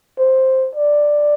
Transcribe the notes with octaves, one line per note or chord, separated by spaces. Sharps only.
C5
D5